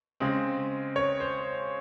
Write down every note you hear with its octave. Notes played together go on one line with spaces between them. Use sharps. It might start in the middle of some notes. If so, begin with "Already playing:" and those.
C#3 G#3 C4
C#5
C5